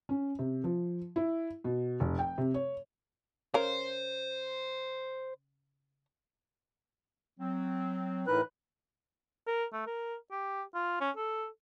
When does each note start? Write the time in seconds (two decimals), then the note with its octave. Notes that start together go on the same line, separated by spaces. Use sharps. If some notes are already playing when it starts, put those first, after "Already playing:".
0.09 C#4
0.39 C3
0.64 F3
1.16 E4
1.64 B2
2.00 F1
2.19 G5
2.38 C3
2.54 C#5
3.54 C#3 A#4 C5
7.40 F#3 C4
8.27 A2 E3 D#4 A#4 B4 F#6
9.47 A#4
9.73 A3
9.87 A#4
10.32 G4
10.75 F4
11.01 C#4
11.17 A4